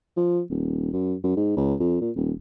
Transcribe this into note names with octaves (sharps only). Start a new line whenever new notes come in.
F3
D#1
F#2
F#2
G#2
C#2
F2
A#2
D#1